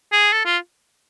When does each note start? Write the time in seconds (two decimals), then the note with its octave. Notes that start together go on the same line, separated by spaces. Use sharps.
0.12 G#4
0.32 A4
0.45 F4